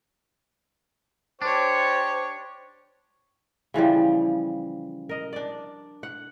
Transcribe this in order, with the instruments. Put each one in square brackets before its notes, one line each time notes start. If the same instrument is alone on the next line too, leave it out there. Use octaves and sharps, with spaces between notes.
[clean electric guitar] D4 [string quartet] G4 C#5 [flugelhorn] C5 [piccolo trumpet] C#6
[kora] C#3 E3 F3 G3
A#4 D#5
D4 D5
F#5